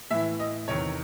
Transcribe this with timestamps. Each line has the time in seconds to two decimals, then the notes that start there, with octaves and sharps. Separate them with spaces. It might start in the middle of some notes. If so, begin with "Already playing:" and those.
0.11 A2 E3 E5
0.40 D#5
0.68 E2 C3 D#3 C#5